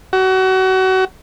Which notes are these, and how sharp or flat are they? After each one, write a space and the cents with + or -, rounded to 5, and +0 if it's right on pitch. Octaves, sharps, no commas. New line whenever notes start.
F#4 +30